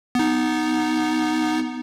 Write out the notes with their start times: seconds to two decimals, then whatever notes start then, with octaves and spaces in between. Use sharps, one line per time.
0.15 B3 D#4